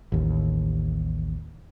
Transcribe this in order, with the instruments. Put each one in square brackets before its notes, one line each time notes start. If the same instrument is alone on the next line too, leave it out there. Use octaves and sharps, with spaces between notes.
[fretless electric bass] A1 D#2